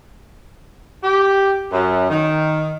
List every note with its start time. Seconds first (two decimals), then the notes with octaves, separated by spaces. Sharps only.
1.03 G4
1.72 F#2
2.10 D#3